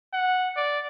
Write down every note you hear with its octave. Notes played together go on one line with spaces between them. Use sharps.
F#5
D5